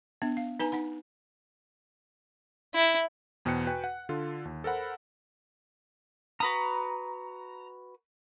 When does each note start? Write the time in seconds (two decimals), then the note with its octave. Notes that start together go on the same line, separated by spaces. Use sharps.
0.22 B3 D4 E5
0.37 F5
0.60 D#4 B4 G#5 A#5
0.72 D#4 F#5 B5
2.75 E4
3.45 E2 B2 C5 G5 F#6 C#7
3.67 F#4 B4 G5 G#5
3.84 F#5
4.09 D3 F4 A4
4.45 D#2
4.64 A4 A#4 C5 F#5 B5
6.40 F#4 B4 A#5 D#6